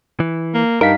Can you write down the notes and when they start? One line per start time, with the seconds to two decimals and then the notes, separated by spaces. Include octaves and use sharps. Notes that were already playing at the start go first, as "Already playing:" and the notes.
0.20 E3
0.54 A#3
0.81 G2 D#4 A#4 F5 B6